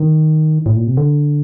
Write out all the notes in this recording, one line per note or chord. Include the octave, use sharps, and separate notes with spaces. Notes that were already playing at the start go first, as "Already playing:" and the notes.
Already playing: D#3
A2
A#2
C3
D3